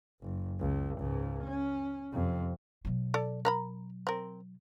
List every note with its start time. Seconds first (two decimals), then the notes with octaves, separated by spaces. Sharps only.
0.22 F#1
0.60 C#2
0.98 C#2 G#2
1.44 C#4
2.12 F2 C3
2.85 B2 F#3
3.14 A4 D5
3.45 A#4 A#5 B5
4.07 C4 A#4